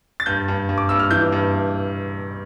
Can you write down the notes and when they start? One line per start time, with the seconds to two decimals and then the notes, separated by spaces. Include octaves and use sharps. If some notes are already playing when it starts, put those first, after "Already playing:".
0.20 A6
0.26 G2 G6
0.48 G2
0.69 G2
0.78 D6
0.89 G2 E6
0.99 F6
1.11 E3 G6
1.32 G2